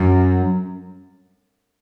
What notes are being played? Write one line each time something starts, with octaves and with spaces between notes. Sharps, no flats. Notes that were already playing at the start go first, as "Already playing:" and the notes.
Already playing: F#2